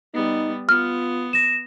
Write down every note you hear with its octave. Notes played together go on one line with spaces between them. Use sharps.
G3 B3 D#4
B3 F4 F6
A#6 E7